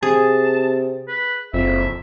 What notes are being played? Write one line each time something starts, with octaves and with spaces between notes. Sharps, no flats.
C3 G#4 A5
B4
F#1 F2 E5